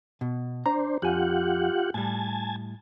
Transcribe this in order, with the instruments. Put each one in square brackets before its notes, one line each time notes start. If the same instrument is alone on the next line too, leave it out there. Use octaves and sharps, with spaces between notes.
[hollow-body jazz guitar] B2
[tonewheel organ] D4 C5 [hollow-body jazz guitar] A#5
[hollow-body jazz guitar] F2 G#5 [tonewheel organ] F4 G4 F#5
[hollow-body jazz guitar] A2 G3 [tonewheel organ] G#5 A5